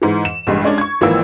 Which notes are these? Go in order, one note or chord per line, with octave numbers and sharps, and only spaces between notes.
G#2 E3
E7
A1 G2 G#3
G#3 C#4 D4
C#6 G#6
G#1 E3 F3 A#3 E6